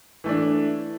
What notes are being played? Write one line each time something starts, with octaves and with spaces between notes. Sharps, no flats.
E3 A3 D4